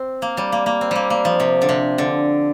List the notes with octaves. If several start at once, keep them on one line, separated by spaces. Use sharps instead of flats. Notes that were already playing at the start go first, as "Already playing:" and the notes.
Already playing: C4
A#3
G3
A#3
A#3
C4
G3 A#3
A#3
F3
C3
D3
C3
D3